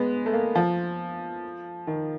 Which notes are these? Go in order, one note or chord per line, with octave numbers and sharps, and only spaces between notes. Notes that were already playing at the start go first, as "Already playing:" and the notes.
Already playing: G#3 B3
A3
A#3
F3
D#3